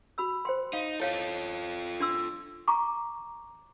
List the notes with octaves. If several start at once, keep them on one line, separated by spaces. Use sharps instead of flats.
F#4 B5 E6
C5 G5 C6
D#4 F5
E4 F4 A4 C#5 F5
D4 C6 E6
A#5 C#6 D6